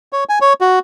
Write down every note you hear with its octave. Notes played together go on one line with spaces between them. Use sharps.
C#5
G#5
C#5
F#4